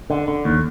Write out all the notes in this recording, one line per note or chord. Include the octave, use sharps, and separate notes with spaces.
D3
D3
D#2